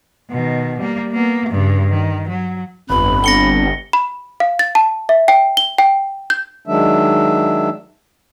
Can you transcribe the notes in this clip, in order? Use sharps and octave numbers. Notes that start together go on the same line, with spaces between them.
B2 D#3
G3 A#3
A#3 B3
G2 C#3
D#3
F#3
G1 F2 B4 B5
B3 C4 D4 A#6 C#7 G7
B5
F5
A6
A5
E5
G5
G7
G5
G6
D#3 F#3 G#3 D4 E5